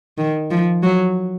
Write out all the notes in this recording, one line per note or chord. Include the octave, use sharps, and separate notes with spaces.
D#3
F3
F#3